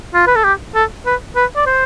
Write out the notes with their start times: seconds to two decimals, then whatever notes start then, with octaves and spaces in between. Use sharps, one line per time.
0.14 F4
0.27 B4
0.36 A4
0.44 G4
0.75 A4
1.06 B4
1.36 B4
1.56 D5
1.66 C5